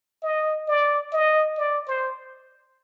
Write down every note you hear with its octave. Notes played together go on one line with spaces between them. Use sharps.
D#5
D5
D#5
D5
C5